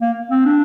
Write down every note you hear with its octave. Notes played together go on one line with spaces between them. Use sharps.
A#3
C4
D4